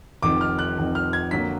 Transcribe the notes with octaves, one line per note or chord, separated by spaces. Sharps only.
F1 F2 D#3 D6
F6
F#6
F1 F2 D#3
F6
G#6
F2 D3 F#3 A#3 B6